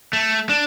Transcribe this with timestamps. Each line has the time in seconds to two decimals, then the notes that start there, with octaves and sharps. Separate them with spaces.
0.13 A3
0.49 D4